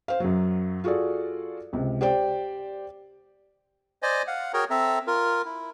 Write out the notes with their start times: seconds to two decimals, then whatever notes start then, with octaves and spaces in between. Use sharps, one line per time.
0.08 C5 F5
0.20 F#2 F#3
0.84 F4 F#4 G#4 A4 D5
1.73 C#2 C3
2.01 G4 C5 D5 G5
4.02 C5 D5 D#5 G#5
4.27 F5 F#5
4.53 F#4 G#4 A#4 C#5 G5 A#5
4.70 C4 A4 E5 A#5
5.07 F4 A#4
5.45 E4